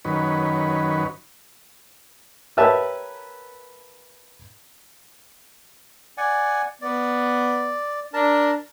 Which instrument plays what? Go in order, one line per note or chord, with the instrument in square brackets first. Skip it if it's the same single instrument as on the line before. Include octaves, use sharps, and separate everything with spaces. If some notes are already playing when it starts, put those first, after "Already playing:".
[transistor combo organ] F#2 D#3 B4 C#5
[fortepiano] G4 A#4 B4 C#5 E5 A5
[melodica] D5 F#5 G#5
[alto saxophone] B3 [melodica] D5
[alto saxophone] D4 [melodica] A#4 A5